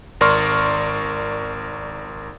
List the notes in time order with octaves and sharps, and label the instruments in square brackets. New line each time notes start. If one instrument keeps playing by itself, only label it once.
[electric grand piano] G#1 A#4 D5 C6 C#6 F6